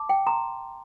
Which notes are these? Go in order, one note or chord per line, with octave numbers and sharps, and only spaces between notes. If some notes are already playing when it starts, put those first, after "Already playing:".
Already playing: A5 D6
G5
A#5 C6